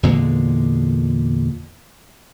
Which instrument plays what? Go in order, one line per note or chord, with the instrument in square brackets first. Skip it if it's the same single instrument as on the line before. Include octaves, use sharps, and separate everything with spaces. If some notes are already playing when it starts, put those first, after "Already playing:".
[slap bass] E2 A#2 D3 G#3